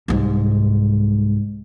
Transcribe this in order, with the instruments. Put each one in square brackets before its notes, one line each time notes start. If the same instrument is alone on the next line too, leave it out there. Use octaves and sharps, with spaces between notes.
[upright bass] C2 G#2